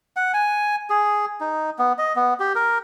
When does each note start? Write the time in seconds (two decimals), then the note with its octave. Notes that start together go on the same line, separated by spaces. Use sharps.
0.16 F#5
0.34 G#5
0.90 G#4
1.41 D#4
1.79 B3
1.98 D#5
2.16 B3
2.40 G4
2.55 A#4